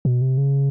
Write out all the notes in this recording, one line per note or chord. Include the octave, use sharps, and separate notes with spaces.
B2
C3
C#3